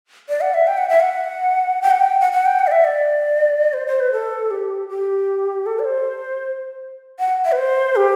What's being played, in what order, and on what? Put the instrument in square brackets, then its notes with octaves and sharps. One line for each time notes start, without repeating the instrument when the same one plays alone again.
[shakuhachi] D5
F#5
E5
G5
F#5
E5
F#5
G5
F#5
G5
F#5
F#5
G5
F#5
D5
E5
D5
C5
C5
B4
A4
G4
G4
A4
D5
C5
F#5
E5
B4
C5
G4